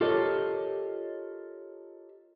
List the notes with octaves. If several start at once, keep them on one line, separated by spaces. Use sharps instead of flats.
F4 G4 A4 A#4 C#5 D#5